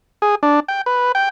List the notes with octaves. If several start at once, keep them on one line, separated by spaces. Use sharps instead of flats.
G#4
D4
G5
B4
G5